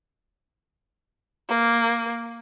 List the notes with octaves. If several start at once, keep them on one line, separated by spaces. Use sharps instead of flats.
A#3